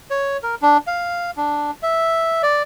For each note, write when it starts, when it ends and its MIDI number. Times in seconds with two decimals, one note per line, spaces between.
0.10 0.37 73
0.43 0.55 70
0.62 0.77 62
0.87 1.31 77
1.37 1.71 62
1.83 2.42 76
2.43 2.63 74